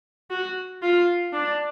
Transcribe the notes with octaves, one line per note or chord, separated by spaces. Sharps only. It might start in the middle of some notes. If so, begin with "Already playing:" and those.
F#4
F4
D4